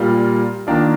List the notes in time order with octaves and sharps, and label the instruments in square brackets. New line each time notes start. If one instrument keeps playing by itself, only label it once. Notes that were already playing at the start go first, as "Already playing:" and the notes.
Already playing: [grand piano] A#2 G3 A#3 F4
D#3 A#3 D4 F4